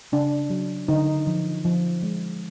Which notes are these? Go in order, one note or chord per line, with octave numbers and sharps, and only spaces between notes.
C#3 D4
F#3
D3 D#4
F3
F3
G#3